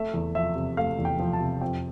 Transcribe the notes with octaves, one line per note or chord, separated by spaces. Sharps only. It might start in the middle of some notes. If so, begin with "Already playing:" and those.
Already playing: A3 E5
E2
F3 E5
C3
A3 F5
E2
G5
F3
A5
C3
F2 G5